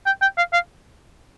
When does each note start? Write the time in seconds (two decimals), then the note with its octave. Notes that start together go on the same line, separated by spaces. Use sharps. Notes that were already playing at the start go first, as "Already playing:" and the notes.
0.06 G5
0.22 G5
0.37 F5
0.53 F5